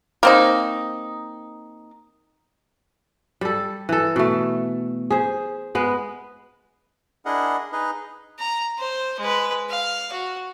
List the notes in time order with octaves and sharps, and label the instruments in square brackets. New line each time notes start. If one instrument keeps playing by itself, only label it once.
[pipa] A#3 C4 D#4
[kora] G3 A4
E3 A4
B2 A3
G#4 C5
G#3 B3
[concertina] D4 E4 G#4 A#4 D#5 F#5
D#4 G#4 B4 D#5
[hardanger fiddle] A#5
C5
G#3 B4
F5
F#4